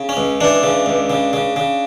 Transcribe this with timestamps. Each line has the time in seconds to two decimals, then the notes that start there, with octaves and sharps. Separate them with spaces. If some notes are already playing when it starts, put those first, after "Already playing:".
Already playing: C#3
0.09 C#4
0.17 C#2
0.41 E3 D4
0.63 C#3
0.86 C#2
1.10 C#3
1.33 C#3
1.56 C#3